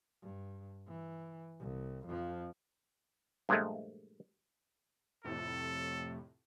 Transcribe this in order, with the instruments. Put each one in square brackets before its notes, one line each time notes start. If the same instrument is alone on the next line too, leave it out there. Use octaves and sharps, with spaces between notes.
[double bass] G2
E3
C2
F2 F3
[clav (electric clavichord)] G2 A#2 F3 G#3 A3
[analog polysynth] F2 A2 C3 [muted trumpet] A4